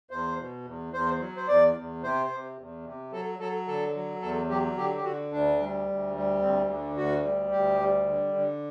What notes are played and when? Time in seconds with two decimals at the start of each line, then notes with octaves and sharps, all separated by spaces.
0.11 E2 C5
0.38 B2
0.65 E2
0.93 E2 C5
1.20 F#3
1.37 C5
1.48 E2 D5
1.75 E2
2.03 C3 C5
2.30 C3
2.58 E2
2.85 C3
3.12 F#3 A4
3.39 F#3 A4
3.67 D3 A4
3.95 F#3
4.22 E2 A4
4.49 F#3 G4
4.77 D3 G4
4.95 G4
5.04 D3 F#4
5.32 D2 D4
5.60 G3
5.87 D2
6.15 G3
6.42 D2 C4
6.69 D3
6.96 D2 F#4
7.24 G3
7.51 D2 G4
7.79 G3
8.06 D3
8.34 D3